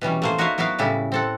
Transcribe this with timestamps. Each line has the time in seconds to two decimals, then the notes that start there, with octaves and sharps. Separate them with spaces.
0.01 B2 E3 G3 C#4
0.22 A3 A#3 C5
0.38 D#4 F#4 A#4 C#5 E5 F5
0.58 F#3 B3 E4 F#4 F5
0.79 A2 C#3 G3 E4 D5
1.12 C4 A4 F#5